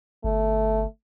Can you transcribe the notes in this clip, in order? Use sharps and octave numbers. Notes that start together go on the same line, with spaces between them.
G1 A3